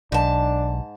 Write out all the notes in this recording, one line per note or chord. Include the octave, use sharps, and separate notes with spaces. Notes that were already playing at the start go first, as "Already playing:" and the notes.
B1 G#2 D4 A5